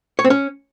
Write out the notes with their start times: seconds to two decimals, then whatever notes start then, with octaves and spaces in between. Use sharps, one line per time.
0.19 C#5
0.25 C4
0.30 C#4